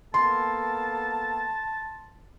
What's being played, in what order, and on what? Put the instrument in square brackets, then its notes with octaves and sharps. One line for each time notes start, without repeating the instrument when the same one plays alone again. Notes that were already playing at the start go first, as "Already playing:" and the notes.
[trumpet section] A#3 B3 A4 [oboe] A5 [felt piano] C6